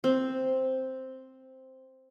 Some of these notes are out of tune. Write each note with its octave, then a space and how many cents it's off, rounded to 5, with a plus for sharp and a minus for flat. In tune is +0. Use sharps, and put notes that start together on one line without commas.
C4 +0